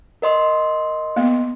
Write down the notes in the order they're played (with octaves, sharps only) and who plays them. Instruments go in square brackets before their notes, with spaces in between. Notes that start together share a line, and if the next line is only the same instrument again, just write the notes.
[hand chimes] A#4 D#5 C6
[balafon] A#3 B3